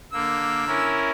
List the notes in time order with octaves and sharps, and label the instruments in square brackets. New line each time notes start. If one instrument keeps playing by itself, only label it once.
[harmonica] D3 E6 [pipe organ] A#3
[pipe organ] C#4 E4 A#4